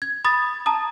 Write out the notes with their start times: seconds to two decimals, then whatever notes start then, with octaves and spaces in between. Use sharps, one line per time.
0.02 G#6
0.25 B5 D#6 A6
0.66 A5 A#5 D#6